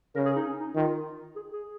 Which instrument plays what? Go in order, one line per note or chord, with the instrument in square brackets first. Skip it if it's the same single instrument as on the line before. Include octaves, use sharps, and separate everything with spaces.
[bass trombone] C#3 [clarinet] A#4
[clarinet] G#4
D#4
C#4
D#4
[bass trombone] D#3 [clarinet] F4
[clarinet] G#4
G#4